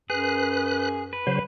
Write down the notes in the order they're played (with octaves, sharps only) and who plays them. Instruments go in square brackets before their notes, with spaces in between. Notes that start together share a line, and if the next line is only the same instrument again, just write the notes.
[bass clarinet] F#2 [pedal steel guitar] G#4 [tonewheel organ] B4 F#6
[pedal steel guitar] B4
[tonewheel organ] C#3 F#3 C5